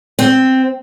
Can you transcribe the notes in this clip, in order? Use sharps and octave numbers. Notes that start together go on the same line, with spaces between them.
C4